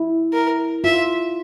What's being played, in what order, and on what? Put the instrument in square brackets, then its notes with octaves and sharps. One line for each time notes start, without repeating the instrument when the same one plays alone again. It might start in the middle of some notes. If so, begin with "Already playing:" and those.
Already playing: [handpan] E4
[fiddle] A#4
[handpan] F4 [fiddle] E5